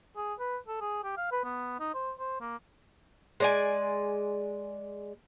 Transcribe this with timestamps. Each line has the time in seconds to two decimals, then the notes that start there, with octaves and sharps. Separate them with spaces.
0.16 G#4
0.39 B4
0.68 A4
0.81 G#4
1.04 G4
1.17 F5
1.32 B4
1.44 B3
1.80 D#4
1.94 C5
2.20 C5
2.41 A#3
3.40 G#3 D5 G#5